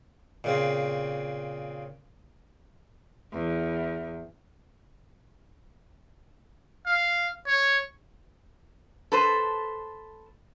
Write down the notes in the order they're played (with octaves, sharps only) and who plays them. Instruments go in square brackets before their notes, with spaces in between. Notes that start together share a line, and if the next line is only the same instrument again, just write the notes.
[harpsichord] A#2 C#3 C4
[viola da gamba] E2
[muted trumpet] F5
C#5
[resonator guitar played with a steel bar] A4 B4 C5